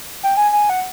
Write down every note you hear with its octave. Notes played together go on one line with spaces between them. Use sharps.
G5
G#5
G#5
F#5